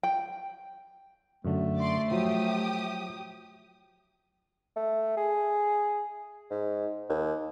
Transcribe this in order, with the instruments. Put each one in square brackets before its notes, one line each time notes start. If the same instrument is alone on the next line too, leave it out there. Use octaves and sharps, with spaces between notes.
[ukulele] G5
[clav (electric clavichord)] F#2 D3 [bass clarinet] A3
[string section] D5 C6
[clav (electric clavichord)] F3 F#3 [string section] G4 D#6
[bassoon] A3
G#4
G#2
D#2